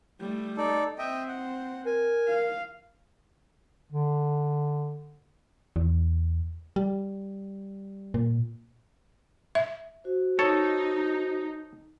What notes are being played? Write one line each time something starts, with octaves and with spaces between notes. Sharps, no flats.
G3 A3
D#4 A4 D5
C4 D#5 E5 G5
F#5
A#4 G#5
F5
D3
E2
G3
A#2
E5
F#4 C5
D#4 A4 C#5